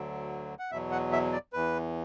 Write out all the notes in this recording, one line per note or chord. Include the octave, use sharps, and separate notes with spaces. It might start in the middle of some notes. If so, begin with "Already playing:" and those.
Already playing: D2 D3 F#3
F#5
E2 B2 F#3 E5
F#5
E5
D5
E2 E3 B4